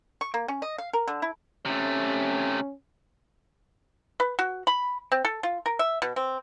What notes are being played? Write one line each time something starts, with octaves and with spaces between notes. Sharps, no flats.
C#6
A#3
C#4
D#5
F5
A#4
D3
E4
C3 A3 C#4
B4
F#4
B5
C4
A4
F4
A#4
E5
B2
C4